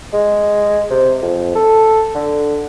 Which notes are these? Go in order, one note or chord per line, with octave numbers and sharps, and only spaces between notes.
G#3
C3
F2
A4
D3